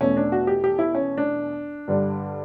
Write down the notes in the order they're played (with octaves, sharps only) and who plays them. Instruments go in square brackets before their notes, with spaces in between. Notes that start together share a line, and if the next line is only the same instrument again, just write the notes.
[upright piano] E2 B2 A3 C#4
D4
F#4
G4
G4
E4
C#4
D4
G2 D3 G3